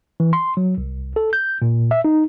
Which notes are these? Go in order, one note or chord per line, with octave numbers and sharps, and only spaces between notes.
E3
C6
F#3
C2
A4
G6
A#2
E5
D#4